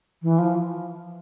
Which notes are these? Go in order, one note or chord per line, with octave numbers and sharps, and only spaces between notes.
E3
F3